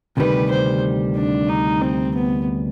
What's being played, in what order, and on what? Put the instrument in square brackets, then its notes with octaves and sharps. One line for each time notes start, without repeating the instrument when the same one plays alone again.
[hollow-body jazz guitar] D2 C3 D#3 G3 [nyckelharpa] B4
[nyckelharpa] C5
D4
D#4
C4
B3